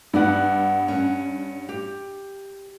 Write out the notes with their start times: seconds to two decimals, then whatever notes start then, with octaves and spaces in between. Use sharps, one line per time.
0.13 G2 B3 D5 F#5
0.88 C#4 F#5
1.69 G4